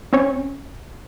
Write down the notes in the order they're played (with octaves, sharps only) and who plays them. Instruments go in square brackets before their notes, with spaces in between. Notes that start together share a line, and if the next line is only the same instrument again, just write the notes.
[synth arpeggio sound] C4 C#4 C#5